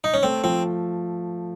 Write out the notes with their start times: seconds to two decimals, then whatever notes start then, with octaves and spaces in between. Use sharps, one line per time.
0.04 D#4
0.14 C#4
0.23 A3 C4
0.44 F3 C4